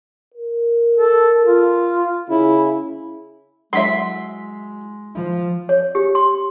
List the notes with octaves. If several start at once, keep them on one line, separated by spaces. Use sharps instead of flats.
A#4
A4
F4
C#3 E4
F#3 G#3 E4 E5 C6 B6
F3
C#5
G4
C6